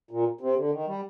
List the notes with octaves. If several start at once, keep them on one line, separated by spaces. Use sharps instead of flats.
A#2
C3
D3
D#3
G3